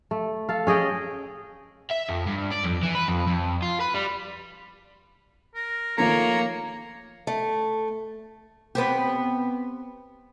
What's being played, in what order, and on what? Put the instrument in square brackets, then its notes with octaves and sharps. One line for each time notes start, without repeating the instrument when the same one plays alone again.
[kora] A3
A4 F5
C#4 G#4 D#5 G5
[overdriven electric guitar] E5
F2
G2
D5
F2
E3
B4
F2
F2
F4
B4
G3
[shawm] A#4
[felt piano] D#3 F3 A3 [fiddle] A#3 [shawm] C#5 [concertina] A#5
[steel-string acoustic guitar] A3
[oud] B3 C4 G4